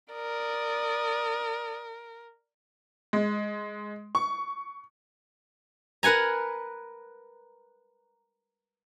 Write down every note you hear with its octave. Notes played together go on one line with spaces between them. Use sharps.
A#4 D5 D#6
G#3
C#6
A#4 B4 F#5 G#5 A#5